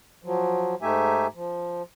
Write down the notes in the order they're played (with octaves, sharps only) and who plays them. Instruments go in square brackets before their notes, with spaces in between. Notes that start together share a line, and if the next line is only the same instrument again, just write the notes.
[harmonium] F3 F#3
G#2 A3 D#4 G4 E5 G#5
F3